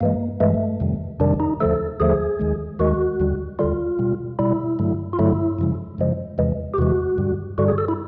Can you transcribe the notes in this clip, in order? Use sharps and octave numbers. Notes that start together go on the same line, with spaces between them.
G2 E3 G#3 A#3
G2 E3 G#3 A3
F2 C3 D#3 G3
F2 C3 D#3 G3 D4
D#4
D#2 D3 F3 A3 A4
D#2 D3 F3 A3 G#4
D#2 D#3 G#3
D#2 D#3 G#3 F#4
D#2 D3 G3
D#2 D3 G3 F4
B2 G3
B2 G3 E4
G2 D3 F#3 A3
F4
G2 D3 F#3 A3 E4
F#2 C#3 F3 G#3
F#2 C#3 F3 G#3
E2 C3 E3 G#3
G4
E2 C3 E3 G#3 F#4
G2 D3 G3
G2 D3 G3 F#4
G#4
A4
E4